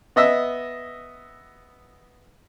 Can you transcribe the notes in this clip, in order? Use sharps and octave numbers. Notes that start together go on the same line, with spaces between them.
B3 D#5 E5 E6